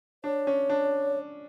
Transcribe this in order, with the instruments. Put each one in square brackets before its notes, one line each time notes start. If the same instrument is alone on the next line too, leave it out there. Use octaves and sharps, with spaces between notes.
[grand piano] D4 [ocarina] C#5
[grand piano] C#4
D4